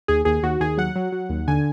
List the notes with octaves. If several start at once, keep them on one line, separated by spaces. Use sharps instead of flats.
D#2 G#4
D#2 G#4
D#2 F#4
D#2 G#4
F#3 F#5
F#3
F#3
D#2
D3 G#5